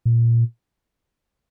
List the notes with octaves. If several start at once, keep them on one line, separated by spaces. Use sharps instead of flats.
A#2